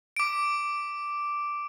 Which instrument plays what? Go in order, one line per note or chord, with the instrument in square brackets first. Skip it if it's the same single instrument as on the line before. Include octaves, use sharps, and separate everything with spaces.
[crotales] D6 D7